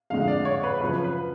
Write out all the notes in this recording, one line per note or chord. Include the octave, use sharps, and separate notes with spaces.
F2 D3 G#3 F5
D5
C#5
B4
F#2 C#3 F3 B4
B4